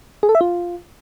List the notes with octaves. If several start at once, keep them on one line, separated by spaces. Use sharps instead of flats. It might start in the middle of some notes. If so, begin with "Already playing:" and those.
G#4
A4
E5
F4